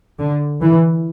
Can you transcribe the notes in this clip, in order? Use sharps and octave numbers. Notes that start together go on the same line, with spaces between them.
D3
E3